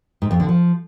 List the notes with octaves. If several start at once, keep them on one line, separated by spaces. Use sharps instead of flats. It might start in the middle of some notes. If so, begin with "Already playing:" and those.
G#2
F2
D3
F3